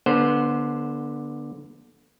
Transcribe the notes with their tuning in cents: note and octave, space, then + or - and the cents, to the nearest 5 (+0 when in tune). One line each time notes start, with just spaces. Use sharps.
D3 +0 B3 -25 C5 +0